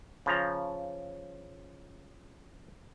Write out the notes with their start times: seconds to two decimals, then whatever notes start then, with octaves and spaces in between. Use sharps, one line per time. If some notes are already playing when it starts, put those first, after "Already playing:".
0.26 C#3 F3 A#5